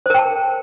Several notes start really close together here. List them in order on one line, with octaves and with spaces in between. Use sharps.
C5 A#4 G5 A5